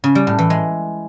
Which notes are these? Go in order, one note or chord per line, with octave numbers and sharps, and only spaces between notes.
C#3
G3
A2
E3
G#3